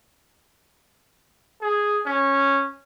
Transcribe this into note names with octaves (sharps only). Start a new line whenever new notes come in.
G#4
C#4